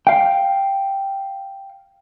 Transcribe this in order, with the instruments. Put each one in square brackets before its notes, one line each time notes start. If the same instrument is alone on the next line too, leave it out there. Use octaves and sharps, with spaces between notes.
[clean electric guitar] F5 G5